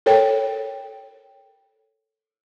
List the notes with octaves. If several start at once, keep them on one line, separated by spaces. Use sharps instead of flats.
A4 A#4 C#5 G5